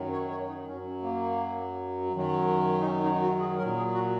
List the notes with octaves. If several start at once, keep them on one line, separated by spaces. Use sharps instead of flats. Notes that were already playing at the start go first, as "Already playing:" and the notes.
Already playing: F#2 D#3 F#3
C#5
C#5
D#4
F#2 F#3 C#4
A#3
F#2 D#3 F#3
D#4
C#4
D#4
F#4
G#4
A#2 F#3 A#4
G#4
F#4